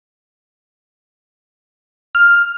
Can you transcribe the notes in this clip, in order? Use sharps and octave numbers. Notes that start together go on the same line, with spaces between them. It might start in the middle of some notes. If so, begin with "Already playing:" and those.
F6